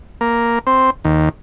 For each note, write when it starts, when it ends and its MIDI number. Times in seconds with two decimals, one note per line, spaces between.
0.21 0.59 58
0.67 0.90 60
1.04 1.29 39